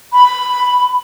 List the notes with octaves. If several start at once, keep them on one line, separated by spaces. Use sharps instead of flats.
B5